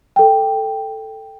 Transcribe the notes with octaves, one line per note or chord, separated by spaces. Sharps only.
A4 G5